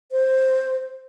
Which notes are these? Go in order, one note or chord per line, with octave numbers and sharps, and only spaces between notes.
C5